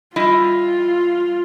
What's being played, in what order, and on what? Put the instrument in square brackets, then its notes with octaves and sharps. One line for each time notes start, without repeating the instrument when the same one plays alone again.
[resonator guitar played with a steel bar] G3 E4 D#5 [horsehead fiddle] F4